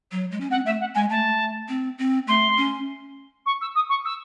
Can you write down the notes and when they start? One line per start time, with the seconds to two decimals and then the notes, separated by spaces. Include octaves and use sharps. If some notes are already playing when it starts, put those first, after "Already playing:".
0.12 F#3
0.31 G#3
0.40 C#4
0.50 C4 F#5
0.65 A3 E5
0.80 F#5
0.95 G#3 G#5
1.10 A3 A5
1.69 C4
1.98 C4
2.27 A3 C6
2.57 C#4
3.46 C#6
3.61 E6
3.75 D#6
3.89 C#6
4.05 E6